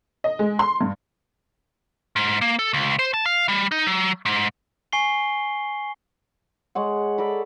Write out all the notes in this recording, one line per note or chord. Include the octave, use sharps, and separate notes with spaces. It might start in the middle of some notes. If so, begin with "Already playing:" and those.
D#5
G#3
C6
G2
G#2
A#3
A4
C#2
C5
A5
F5
G3
D#4
F#3
G#2
G#5 C#6 C7 G7
G#3 C#5 F#5
A4 D5 A#5 B5